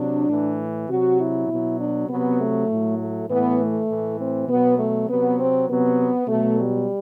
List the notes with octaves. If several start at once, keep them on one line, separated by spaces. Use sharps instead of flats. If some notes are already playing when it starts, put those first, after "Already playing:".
Already playing: C3 F#3 D4
A2 E3
C3 F#3 F#4
E4
B2 F#3
D4
C3 F#3 B3
A3
A2 F#3
A3
A2 E3 B3
A3
A2 E3
C4
B2 F#3 B3
A3
C3 F#3 B3
C4
C3 F#3 B3
B2 F#3 A3
G3